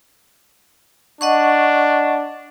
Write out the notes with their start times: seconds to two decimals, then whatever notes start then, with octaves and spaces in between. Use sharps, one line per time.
1.21 D4 D#5 F#5 C#6